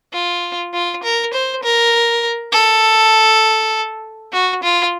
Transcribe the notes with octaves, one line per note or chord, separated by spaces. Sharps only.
F4
F4
A#4
C5
A#4
A4
F#4
F4